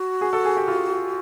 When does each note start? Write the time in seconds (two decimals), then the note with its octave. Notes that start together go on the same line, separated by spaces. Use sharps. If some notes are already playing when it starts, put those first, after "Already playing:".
Already playing: F#4
0.21 G#4
0.33 A4
0.45 G#4
0.57 G4
0.68 F4